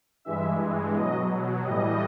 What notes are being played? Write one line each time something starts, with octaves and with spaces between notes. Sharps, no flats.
G2 E3 G#3 E5
B2 F#3 D#5
A2 E3 G3 D#5